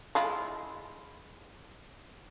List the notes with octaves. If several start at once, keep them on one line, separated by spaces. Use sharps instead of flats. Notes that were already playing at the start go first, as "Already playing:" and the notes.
G#3 E4 F4